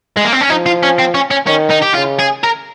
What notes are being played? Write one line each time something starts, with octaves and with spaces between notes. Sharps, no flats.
G#3
A#3
C4
C#4
F3 D#4
F4
C#4
C4
C#4
C#4
D#3 C#4
D#4
G4
C#3 F4
G#4
A#4